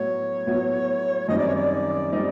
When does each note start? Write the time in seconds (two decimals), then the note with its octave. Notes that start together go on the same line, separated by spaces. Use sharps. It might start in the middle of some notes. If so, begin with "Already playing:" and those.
Already playing: A2 F#3 B3 C#5
0.47 A2 F#3 B3
1.28 F#2 D#3 G3 C4 D#4 D#5
1.37 D5
1.47 C#5
1.55 D5
2.12 D#3 G3 C4 D#4